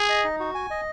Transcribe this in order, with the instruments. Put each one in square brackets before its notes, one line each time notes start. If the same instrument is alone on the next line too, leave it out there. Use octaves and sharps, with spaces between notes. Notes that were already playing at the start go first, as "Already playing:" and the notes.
Already playing: [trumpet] G#4
[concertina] D#5
D#4
F#4
G#5
D#5